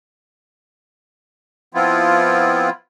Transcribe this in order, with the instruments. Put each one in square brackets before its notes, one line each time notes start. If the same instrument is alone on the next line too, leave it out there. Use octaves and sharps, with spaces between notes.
[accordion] F3 B3 C4 E4 F4